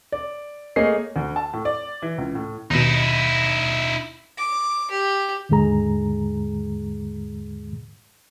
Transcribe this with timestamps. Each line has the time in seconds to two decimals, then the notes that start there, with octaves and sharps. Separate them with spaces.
0.12 D5
0.76 A3 A#3 G#4 C#5 D#5 C7
1.16 D2
1.36 A5
1.53 A2
1.65 D5
2.02 E3
2.18 C#2
2.35 A2
2.71 D#2 B2 D#4 E4
4.38 D6
4.91 G4
5.49 D#2 G#2 D3 G#3 G#4 A#5